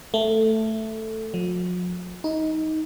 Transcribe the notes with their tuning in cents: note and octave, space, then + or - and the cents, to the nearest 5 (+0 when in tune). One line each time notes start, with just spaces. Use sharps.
A3 +5
F3 +45
D#4 +15